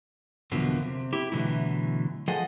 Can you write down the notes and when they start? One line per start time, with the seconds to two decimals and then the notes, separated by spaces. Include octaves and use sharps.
0.52 E2 B2 D3 F3 F#3 A#3
0.80 C3
1.13 E4 G4
1.32 B2 D3 E3 F#3 A3 E4
2.28 F3 G#4 A4 D#5 F#5 G#5